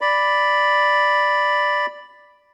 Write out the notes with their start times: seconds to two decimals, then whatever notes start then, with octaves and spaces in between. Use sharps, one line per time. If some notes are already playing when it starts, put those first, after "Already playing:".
0.01 D5 B5